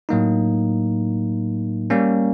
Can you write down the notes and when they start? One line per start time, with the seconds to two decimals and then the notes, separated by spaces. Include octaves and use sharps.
0.09 A2 F#3 A#3 D#4
1.90 G3 A#3 C#4